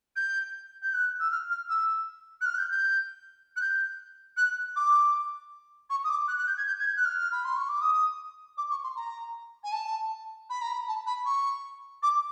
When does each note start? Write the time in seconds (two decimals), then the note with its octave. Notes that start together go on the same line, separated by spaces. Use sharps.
0.16 G6
0.82 G6
0.94 F#6
1.20 E6
1.31 F6
1.50 F6
1.69 E6
2.41 F#6
2.46 F6
2.54 F#6
2.58 G6
2.71 G6
3.56 F#6
3.61 G6
4.37 F#6
4.76 D6
5.90 C#6
6.04 D#6
6.09 D6
6.28 F#6
6.38 F#6
6.47 G6
6.57 G#6
6.67 G6
6.80 G#6
6.86 G6
6.97 F#6
7.05 F6
7.32 B5
7.45 C6
7.56 C#6
7.69 D6
7.81 D#6
8.57 D6
8.70 C#6
8.84 C6
8.96 A#5
9.64 G#5
9.72 A5
10.50 B5
10.61 A#5
10.73 B5
10.88 A5
11.07 B5
11.26 C#6
12.03 D6